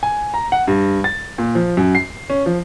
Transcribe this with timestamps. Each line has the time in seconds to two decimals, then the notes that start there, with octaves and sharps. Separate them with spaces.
0.03 G#5
0.34 A#5
0.52 F#5
0.68 G2
1.04 A6
1.38 A#2
1.55 F3
1.77 F#2
1.95 C7
2.30 C#4
2.46 F3